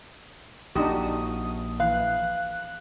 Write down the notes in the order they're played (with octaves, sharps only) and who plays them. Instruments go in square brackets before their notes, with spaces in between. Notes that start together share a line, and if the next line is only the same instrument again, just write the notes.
[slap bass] A#1 [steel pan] D4 D#4 G4 [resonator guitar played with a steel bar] F#4 [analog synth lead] D#6
[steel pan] E3 [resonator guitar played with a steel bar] F5 [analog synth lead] F#6